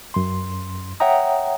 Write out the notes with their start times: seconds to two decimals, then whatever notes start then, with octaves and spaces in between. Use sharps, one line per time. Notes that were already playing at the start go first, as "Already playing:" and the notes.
0.14 F#2 C6
1.00 C#5 E5 F#5 G5 A#5 D#6